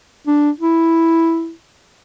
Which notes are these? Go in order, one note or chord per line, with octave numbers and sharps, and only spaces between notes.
D4
E4